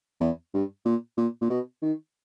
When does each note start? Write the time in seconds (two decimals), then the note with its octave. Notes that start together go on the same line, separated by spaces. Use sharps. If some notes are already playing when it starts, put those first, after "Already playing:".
0.21 E2
0.54 G2
0.86 A#2
1.17 A#2
1.41 A#2
1.50 B2
1.82 D#3